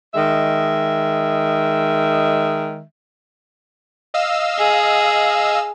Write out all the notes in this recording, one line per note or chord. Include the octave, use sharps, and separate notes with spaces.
D#3 G#3 E5
D#5 F5 E6
G#4